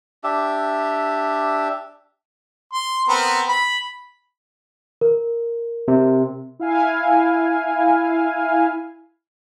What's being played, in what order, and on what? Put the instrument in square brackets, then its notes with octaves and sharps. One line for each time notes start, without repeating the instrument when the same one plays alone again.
[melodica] D4 G4 E5
[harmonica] C6
B3 C4 A#4
B5
[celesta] A#4
[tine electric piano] C3
[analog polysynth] E4 F5 G#5